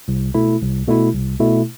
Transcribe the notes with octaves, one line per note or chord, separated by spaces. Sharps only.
C2
B2 A3 E4
C2
B2 A3 E4
C2
B2 A3 E4